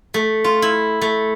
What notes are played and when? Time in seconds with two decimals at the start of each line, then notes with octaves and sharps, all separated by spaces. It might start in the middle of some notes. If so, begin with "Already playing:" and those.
0.14 A3
0.44 F4
0.62 E4
1.02 A3